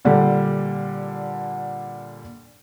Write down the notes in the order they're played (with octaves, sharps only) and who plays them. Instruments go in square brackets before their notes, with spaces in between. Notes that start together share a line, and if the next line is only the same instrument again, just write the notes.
[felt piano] A#2 D3 G3